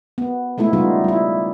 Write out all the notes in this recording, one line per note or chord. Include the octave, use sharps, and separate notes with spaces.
B3
G#3 A3 B3 E4
C#3 G3 B3 D#4 F4
G3 E4